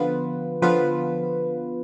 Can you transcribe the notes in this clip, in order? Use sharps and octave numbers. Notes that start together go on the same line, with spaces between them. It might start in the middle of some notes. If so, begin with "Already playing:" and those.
Already playing: D3 F3 B3 F4 B4
D3 F3 B3 F4 B4